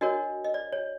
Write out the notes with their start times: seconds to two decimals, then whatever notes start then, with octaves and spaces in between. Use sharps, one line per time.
0.01 D4 F#4 A#4 C#5 D#5
0.44 D#5
0.54 D5
0.73 C#5